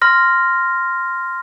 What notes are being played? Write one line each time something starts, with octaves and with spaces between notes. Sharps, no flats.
C6 F6 A#6